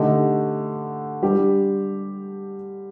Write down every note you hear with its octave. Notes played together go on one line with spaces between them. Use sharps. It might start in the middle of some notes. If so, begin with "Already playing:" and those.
Already playing: D3 A3 D#4 G4
G3 D4 G4